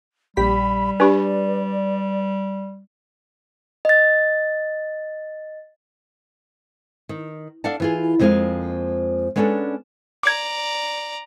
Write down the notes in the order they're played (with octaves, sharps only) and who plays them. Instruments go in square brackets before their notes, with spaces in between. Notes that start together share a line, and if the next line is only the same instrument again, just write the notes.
[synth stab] A#1 G4 B6 [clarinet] G3 [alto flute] B5
[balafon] D4 G4 [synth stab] B4 [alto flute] D5
[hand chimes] D#5 A6
[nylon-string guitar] D#3
D4 A4 D5 F5 F#5 A5
E3 F4 G#4
F2 F3 G#3 A#3 G#4 F5
G#3 B3 C#4 D4 G4 A4
[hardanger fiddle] D5 A#5 [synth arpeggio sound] D6 G#6